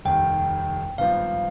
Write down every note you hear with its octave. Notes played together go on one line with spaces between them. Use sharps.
F1 D#2 D#3 G3 G5
G#1 G2 F3 B3 F4 F5